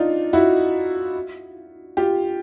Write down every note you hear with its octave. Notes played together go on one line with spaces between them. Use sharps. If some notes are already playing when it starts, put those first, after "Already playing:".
Already playing: D4 D#4 F4
E4 F#4
F4 G4